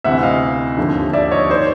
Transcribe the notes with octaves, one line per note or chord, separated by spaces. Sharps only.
D2 C3 E3 E5 F#5
D#5 F5
D#2 D3 F3
D5 E5
C#5 D#5
D#3 C5 D5